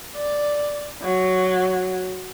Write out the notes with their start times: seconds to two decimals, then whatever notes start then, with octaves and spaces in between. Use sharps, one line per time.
0.15 D5
1.02 F#3